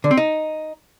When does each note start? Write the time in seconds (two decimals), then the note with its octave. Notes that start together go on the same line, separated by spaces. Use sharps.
0.04 D3
0.11 C4
0.17 D#4